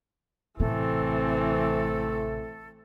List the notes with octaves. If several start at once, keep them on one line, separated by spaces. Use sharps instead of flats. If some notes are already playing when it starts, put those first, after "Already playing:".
A1 C3 E3 A3 C4 A4